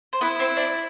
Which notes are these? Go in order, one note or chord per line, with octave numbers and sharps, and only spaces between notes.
C5
B3 E4 B4
C4 C5
D4 D5